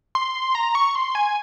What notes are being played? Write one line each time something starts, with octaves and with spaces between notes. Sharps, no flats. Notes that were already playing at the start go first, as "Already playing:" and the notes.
C6
A#5
C#6
C6
G#5